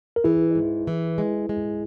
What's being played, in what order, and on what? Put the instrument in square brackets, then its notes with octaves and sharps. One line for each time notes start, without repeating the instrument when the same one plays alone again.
[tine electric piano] A#4
[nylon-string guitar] E3 [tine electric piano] E4 G#4
[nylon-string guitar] G#2
E3
G#3
G#3